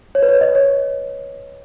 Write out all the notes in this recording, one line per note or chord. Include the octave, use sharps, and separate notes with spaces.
C#5
B4
C#5
D#5
C#5